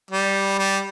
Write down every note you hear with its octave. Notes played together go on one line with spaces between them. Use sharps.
G3
G3